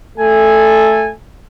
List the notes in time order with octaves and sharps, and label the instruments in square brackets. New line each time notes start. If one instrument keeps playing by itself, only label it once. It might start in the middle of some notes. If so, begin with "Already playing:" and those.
[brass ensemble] A3 A4 G#5